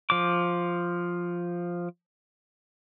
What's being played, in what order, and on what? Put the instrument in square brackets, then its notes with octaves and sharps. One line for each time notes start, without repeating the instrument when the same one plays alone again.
[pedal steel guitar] F3 D6